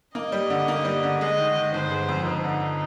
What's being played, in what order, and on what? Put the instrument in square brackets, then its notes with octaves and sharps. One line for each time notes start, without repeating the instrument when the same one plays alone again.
[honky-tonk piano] A#3 [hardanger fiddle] D#5
[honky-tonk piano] G3
D3
A#3
G3
D3
[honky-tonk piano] G#3 [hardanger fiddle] D#5
[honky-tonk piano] D#3
D#3
[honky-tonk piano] G1 [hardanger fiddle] C5
[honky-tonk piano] G#3
F2
[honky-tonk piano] G1 [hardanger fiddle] D#4
[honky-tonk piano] D3